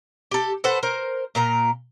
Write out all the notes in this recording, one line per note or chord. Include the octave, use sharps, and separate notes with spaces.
G4 A4
A4 B4 C5 F#5
A#4 C5
A#2 A#4 A#5